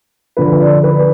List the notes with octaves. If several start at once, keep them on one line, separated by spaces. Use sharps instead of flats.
D3 F3 B4
D5
B4